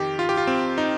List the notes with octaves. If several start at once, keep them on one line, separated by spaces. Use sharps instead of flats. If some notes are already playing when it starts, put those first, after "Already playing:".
Already playing: F2 D#3 G4
F4
G4
F4
C4
D#4